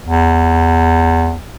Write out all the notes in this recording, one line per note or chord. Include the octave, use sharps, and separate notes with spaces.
E2